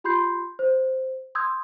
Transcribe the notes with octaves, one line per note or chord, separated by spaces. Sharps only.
F4 G4 B5 C6 G6 C7
C5
C6 D#6 E6 G6 G#6